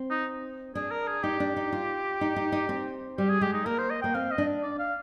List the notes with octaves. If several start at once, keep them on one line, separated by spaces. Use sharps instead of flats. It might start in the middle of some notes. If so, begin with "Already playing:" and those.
Already playing: C4
D#4
D4 G#4
A#4
G#4
D#4 G4
D4
D#4
F4
D#4
D#4
D#4
C4
G3 G4
G#4
G#3 G4
D#4
A#3 A#4
C5
D#5
A#3 G5
C4 F5
D#5
D4
D5
F5